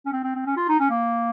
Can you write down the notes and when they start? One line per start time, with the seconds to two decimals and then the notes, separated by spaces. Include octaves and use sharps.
0.06 C#4
0.12 C4
0.23 C4
0.35 C4
0.46 C#4
0.57 F4
0.69 D#4
0.80 C#4
0.90 A#3